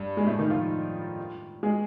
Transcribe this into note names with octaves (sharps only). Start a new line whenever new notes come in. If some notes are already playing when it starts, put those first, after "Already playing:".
Already playing: G2
G#3
A2 A3
D#3 D#4
F3 F4
G#3 G#4